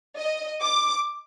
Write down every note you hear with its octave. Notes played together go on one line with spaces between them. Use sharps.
D#5
D6